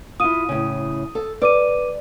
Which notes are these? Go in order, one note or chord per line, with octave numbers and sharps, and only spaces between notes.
E4 F4 D#6 D#7
A2 C#3
A4
B4 D5 D6 D#7